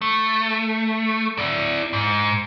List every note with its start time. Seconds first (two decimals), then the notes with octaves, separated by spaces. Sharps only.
0.02 A3
1.38 E4 D5
1.93 G#2